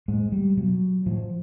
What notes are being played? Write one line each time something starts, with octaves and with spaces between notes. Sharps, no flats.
A2 G#3
G3
B2 F#3
A2 F3